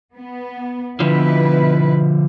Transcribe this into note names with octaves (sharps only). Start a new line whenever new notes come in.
B3
B2 D3 F3 E4 B4